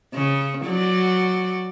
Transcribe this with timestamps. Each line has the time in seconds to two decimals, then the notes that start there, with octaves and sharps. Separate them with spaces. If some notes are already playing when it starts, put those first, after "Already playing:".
0.14 C#3
0.66 F#3 D5